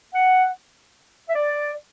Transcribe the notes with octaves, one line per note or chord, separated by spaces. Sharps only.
F#5
E5
D5